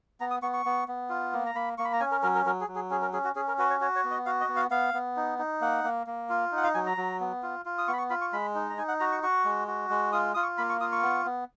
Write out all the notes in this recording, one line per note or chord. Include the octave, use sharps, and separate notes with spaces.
B3 A#5
D#6
B3 C#6
C#6
B3
B3
F4
A#3
A#5
A#3 B5
A#3 C#6
B5
A#5
C#4 G#5
A#4
F#3 A#4
A#4
F#3 A#4
G#4
F#3
G#4
C#4 G#4
A#4
C#4 G#4
F#4
C#4 G#4
A#4
F#4 B4
C#5
F#4 C#5
C#5
B3
D#5
F#4 F5
D#5
B3
F5
B3 F5
B3
D#4
D#4
A#3 F#5
A#3
A#3
F4
D#4
F#5
F5
F#3 G#5
A#5
F#3
B3
F4
F4
D#6
B3 C#6
B5
C#6
F4 B5
C#6
G#3 B5
D#4
A#5
D#4 G#5
F#5
F#4 A#5
C#6
F#4 C#6
G#3
F#4
G#3
F4 D#6
F4 D#6
C#6
A#3 B5
C#6
F4 D#6
C#6
B3
B3